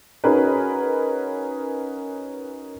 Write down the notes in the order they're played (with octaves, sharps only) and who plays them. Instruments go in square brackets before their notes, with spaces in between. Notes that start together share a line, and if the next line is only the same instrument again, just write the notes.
[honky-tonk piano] C#4 D#4 F#4 G#4 A#4 B4